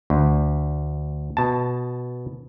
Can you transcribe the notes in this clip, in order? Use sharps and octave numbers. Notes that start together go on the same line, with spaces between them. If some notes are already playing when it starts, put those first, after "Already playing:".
D2
B2 A5